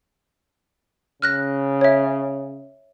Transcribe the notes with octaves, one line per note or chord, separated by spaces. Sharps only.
C#3 F6 F#6 A#6
C#5 E5